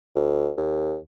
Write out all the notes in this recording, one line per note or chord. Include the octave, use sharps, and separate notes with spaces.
D2
D#2